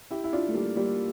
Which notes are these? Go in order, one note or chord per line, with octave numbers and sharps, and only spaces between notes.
E4 G4
E4
D4 F4
A3
G3 A#3
G3 A#3